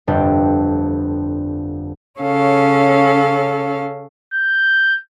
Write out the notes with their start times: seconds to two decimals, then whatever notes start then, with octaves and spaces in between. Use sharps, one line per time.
0.07 G1 F2 G3 D4 G4
2.20 C#3 C#4 A4 C#5 F5
4.34 G6